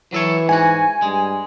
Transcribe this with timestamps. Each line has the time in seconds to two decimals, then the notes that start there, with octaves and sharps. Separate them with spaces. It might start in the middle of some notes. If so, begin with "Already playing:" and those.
0.13 E3 F#3 A4 C#5
0.49 G#2 F#4 G#5
1.02 G2 G#3